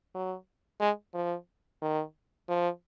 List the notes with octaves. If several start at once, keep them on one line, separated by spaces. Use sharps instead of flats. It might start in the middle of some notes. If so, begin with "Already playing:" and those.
F#3
G#3
F3
D#3
F3